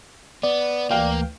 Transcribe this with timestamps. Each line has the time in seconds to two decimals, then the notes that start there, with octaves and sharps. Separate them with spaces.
0.43 B3 D5
0.91 D2 E3 A#3 F5 G5